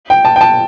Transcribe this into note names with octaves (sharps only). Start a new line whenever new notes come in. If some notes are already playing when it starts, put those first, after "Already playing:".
G5
A5
G5
A5